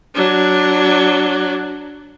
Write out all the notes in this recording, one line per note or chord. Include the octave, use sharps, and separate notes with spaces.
F#3 D4